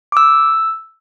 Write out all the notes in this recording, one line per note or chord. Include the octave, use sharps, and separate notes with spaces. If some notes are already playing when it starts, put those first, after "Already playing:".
D6
E6